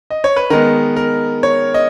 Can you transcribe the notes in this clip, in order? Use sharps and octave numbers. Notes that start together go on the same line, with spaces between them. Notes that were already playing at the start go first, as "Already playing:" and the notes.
D#5
C#5
B4
D#3 G#3 B3 A#4
A#4
C#5
D#5